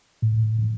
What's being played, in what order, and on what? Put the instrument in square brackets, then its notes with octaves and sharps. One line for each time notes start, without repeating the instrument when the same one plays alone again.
[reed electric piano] A2